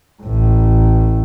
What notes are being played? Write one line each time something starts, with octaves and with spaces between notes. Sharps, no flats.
A1 A2